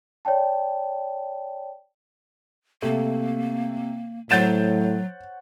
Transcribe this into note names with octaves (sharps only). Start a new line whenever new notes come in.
C#5 D5 G5 A5
C3 A3 A#3
A2 F#3 C5 C#5 F#5 G6 A6 E7